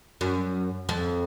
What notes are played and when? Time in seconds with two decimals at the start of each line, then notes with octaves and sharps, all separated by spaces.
0.21 F#2
0.89 F2